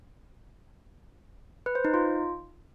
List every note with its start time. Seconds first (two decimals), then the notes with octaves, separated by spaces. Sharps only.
1.66 B4
1.75 C5
1.85 D#4
1.94 F4